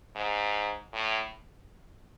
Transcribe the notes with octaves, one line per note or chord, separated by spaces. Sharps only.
G#2
A2